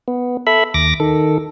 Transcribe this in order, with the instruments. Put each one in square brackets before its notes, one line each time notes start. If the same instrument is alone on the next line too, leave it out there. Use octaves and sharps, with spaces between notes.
[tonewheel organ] B3
A4 E5 B5
D#2 D6 A#6
D#3 A4